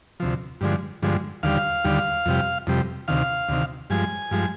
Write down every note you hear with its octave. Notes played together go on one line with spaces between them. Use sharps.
D2 C3 F3
G2 D3 F3 G#3
G2 D3 F3 G#3
D#2 D3 G3 F5
D#2 D3 G3
F2 C3 G3
F2 C3 G3
D2 C3 D#3 F5
D2 C3 D#3
G2 F3 G#3 G#5
G2 F3 G#3